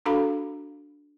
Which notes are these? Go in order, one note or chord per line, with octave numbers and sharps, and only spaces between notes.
D4 F#4 A4 F5 A#5 B5